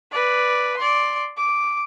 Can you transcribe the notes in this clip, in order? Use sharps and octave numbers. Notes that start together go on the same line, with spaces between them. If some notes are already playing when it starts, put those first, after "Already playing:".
B4 D5
D5 C6
D6